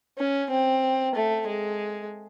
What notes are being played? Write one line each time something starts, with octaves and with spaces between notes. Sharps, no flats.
C#4
C4
A3
G#3